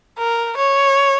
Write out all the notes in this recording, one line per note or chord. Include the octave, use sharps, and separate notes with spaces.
A#4
C#5